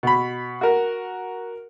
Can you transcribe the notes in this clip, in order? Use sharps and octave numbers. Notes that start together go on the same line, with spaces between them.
B2 B5
F#4 A#4